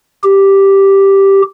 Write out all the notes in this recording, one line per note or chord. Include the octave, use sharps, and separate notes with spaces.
G4